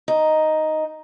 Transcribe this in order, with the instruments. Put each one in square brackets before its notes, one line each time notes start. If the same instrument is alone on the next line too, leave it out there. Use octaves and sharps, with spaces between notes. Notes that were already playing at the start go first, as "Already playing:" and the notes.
[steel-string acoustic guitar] D#4